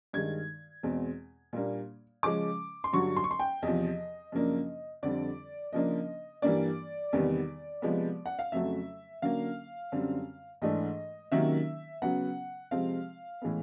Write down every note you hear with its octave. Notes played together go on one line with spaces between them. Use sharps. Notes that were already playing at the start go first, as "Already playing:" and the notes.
G2 D#3 G#3 G#6
E2 B2 G#3 C4
A#2 G3 A#3 D4
C#3 F3 G#3 C#4 D6
C6
G2 D3 F#3 C#6
C6
C#6
C6
G5
E2 C3 F3 D#5
F#2 C#3 F3 A#3 D4
F2 D3 G3 C4 D5
C#3 F3 A#3 D4 D#5
G2 E3 G3 A#3 D4 D5
E2 C3 D#3 G3 B3
C3 F3 G#3 B3
F#5
F5
F2 C#3 F#3 A3 E5
D3 F#3 A#3 C#4 F5
F#2 D3 G3 C4
G#2 E3 A3 D4 D#5
C3 D#3 F#3 A#3 C#4 E5
C#3 F#3 B3 F#5
C3 F3 G#3 C4 F5
A2 E3 G#3 B3